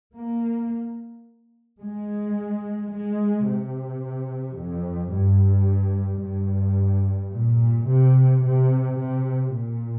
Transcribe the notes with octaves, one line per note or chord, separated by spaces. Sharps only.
A#3
G#3
G#3
C3
F2
G2
G2
A#2
C3
C3
C3
A#2